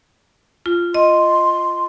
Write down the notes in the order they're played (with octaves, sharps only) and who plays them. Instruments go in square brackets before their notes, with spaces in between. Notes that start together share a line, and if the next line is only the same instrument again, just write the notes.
[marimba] F4
[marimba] D#5 [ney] C6